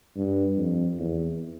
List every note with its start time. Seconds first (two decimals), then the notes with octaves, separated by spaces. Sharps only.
0.16 G2
0.57 F2
0.99 E2